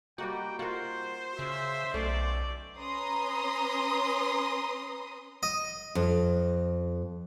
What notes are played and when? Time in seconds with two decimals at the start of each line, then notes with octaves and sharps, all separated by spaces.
0.18 G3 A#3 D#4 F#4 G5
0.59 F4 F#4 A#4 C5
1.39 C#3 E5
1.94 B1 A3 C#4 D5
2.78 C#4 B4 A#5 C6 D#6
5.43 D#5
5.95 F2